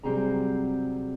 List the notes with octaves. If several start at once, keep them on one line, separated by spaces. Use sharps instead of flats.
C3 F#3 G3 C4 G#4 A#5